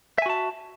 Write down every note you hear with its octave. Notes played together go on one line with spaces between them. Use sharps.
F#4 E5 G#5 A5